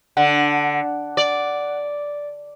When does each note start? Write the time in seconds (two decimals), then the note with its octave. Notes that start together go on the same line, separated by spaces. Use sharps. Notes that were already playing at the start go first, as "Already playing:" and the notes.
0.17 D3 F#5
1.17 D5